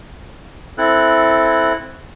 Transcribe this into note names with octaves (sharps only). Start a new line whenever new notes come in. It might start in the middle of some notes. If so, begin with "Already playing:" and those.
C4 E4 A4 F#6